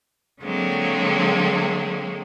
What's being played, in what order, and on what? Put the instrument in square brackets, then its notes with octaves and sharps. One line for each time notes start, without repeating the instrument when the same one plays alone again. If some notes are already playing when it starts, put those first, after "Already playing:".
[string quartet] D3 F#3 G#3 A#3 C4